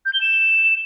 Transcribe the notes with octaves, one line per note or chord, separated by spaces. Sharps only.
G6
G7
E7